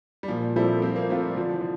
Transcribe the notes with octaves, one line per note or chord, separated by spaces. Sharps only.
G3
A#2 F3
F3 G3 C4 E4 A4
F3 C4
A#3
A3 C4 F4
G3
D3 F3
E3
D3